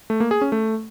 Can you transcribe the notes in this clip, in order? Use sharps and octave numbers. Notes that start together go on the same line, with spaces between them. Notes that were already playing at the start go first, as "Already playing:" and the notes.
A3
A#3
G#4
C#4
A3